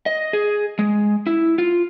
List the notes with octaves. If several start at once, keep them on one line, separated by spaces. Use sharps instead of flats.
D#5
G#4
G#3
E4
F4